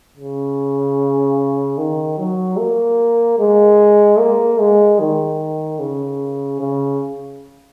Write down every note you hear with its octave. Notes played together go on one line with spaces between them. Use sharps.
C#3
D#3
F#3
A#3
G#3
A#3
G#3
D#3
C#3
C#3